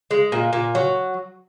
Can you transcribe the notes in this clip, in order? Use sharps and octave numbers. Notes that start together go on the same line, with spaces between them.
G#3
A#2
A#2
F#3